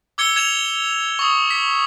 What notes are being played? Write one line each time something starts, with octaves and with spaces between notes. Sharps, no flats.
D6 E6 G#6 C#7 G7
G#6 E7 F7
C#6 D#6
D6 B6